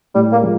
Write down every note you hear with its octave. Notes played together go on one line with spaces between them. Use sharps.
A2 G3
A#3
F3 G#3